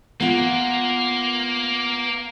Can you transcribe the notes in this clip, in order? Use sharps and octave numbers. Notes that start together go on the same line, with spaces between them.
A#3 B3 F4